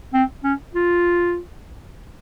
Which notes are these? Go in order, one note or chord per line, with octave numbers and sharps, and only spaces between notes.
C4
C#4
F4